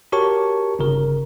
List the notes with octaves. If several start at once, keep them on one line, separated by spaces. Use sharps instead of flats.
F#4 G4 A#4 C#5 A5 C#6
G1 C#3 A#4